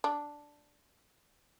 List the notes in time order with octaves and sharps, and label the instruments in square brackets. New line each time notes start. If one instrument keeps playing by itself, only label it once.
[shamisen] D4